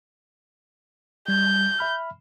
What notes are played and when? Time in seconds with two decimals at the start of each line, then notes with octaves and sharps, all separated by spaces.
1.28 G3 G6 G#6
1.79 E5 B5 F6